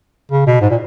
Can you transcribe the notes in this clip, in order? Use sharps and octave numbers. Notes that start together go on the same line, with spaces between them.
C#3
B2
G#2
A#2